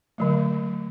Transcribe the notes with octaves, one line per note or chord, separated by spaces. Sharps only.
D3 F#3 A3